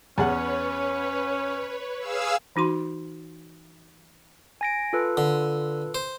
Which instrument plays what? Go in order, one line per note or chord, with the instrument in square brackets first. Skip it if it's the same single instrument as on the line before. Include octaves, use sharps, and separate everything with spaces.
[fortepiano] E2 G#4 F#5 [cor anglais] C#4 [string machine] B4 C#5
[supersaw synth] G#4 F5 E6
[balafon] E3 D#4 F#4 C6
[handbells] G#5 A#6 D7
F4 A4 B4
[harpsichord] D3
C5